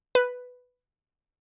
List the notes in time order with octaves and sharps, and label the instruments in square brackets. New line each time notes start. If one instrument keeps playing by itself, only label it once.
[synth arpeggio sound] B4